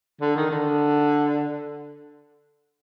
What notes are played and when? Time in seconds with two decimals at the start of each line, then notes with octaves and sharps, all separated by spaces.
0.21 D3
0.36 D#3
0.51 D3